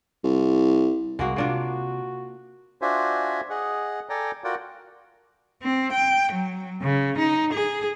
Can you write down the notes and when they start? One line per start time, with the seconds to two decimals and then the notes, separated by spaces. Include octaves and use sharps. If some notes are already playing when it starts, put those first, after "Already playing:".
0.24 C2
1.19 C2 G#3 A#3 F#4
1.36 C3 A#3 D4 F4 F#4
2.82 D4 F4 F#4 C5 E5 G#5
3.50 G#4 D#5 F#5
4.10 A4 D5 G5 G#5 A#5
4.44 F4 F#4 A#4 D5 F#5 G5
5.62 C4
5.92 G5
6.32 F#3
6.82 C#3
7.18 D#4
7.53 G#4